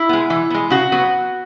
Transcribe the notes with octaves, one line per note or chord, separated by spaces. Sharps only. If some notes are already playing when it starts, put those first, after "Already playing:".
Already playing: E4
G#3 B3
E3
G#3 B3
C#3 F#4
F#3 B3